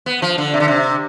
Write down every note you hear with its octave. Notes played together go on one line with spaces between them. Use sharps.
B3
F3
D3
C3
D3
C3